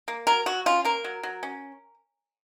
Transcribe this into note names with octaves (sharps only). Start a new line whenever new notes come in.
A#3
F#3 A#4
F#3 F#4
C#4 F4
A#3 A#4
F#3
F#3
C#4